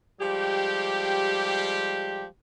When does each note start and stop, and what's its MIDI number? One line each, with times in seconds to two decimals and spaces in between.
0.20 2.25 53
0.20 2.25 55
0.20 2.25 56
0.20 2.25 67